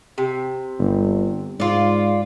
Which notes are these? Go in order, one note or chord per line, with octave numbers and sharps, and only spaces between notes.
C3
G1
G#2 F4 D5